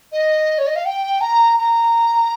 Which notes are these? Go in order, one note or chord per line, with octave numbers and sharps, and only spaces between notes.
D#5
C#5
D#5
F5
G5
A#5
A#5